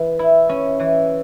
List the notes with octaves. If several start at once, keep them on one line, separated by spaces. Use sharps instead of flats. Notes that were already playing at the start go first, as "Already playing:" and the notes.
Already playing: E3
E4
C#4
E3